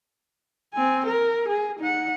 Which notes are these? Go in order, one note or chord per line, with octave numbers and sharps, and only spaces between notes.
C4 G#5
A#4
G#4
D#4 F#5